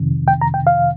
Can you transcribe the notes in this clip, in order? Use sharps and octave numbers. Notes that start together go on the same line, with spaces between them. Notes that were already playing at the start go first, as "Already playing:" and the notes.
Already playing: F2 C3 D#3
G5
A#5
G5
F5